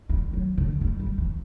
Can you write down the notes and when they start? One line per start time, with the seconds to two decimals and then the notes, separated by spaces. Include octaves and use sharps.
0.09 G3
0.33 F#3
0.58 D3
0.81 G3
1.00 G3
1.18 E3